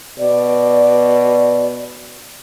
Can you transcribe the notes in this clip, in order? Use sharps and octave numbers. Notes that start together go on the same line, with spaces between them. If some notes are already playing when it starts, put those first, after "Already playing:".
B2 D5